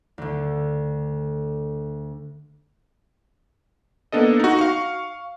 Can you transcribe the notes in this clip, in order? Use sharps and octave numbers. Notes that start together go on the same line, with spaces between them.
D2 D3
A#3 B3 D4 A4 D#5
D#4 F#4
F5 C#6